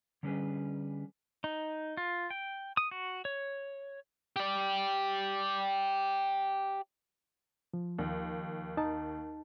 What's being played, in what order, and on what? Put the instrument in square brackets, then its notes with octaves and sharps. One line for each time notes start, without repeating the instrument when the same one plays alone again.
[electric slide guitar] D3 G3 A3 C#4 G#4 B4
[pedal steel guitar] D#4
F4
G5
D#6
F#4
C#5
[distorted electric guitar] G4 D5
[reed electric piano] F3
[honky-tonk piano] D#2
[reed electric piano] D#4 A5